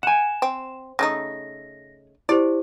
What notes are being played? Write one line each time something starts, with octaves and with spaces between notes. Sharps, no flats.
F#5 G#5 E7
C4
C#3 A3 D#4 A#6
E4 G4 C5 D5